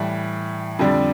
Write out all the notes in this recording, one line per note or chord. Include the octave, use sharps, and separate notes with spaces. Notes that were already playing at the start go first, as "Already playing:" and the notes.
Already playing: A2 E3 G3
F2 D3 G3 D4